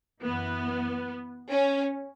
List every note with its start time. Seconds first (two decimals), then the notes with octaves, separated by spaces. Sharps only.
0.23 F#2 E3 B3
1.50 C#4